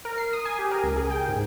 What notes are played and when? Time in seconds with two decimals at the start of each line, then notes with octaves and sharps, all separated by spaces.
0.05 A#4
0.18 C7
0.33 D#6
0.45 G#5
0.59 G4
0.71 A#4
0.83 C#2
0.96 G#4
1.10 G5
1.28 G#2